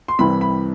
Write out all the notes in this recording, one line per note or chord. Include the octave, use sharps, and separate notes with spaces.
C6
C2 C3 E3 G3 B5
B5